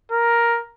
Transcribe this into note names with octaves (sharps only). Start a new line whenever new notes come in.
A#4